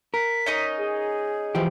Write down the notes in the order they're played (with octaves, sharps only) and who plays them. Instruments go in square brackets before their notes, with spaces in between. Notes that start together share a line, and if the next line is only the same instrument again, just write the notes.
[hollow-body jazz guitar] A#4 [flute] B6
[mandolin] C#4 D#4 D#5
[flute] G#4
[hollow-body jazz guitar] E3 F3 G4